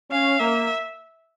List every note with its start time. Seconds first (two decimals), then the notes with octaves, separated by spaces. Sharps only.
0.11 C#4 F5
0.40 A#3 E5